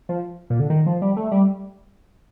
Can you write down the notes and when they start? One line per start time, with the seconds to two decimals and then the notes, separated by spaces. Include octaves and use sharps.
0.09 F3
0.50 A#2
0.60 D3
0.70 D#3
0.86 F3
1.02 G3
1.17 A3
1.32 G3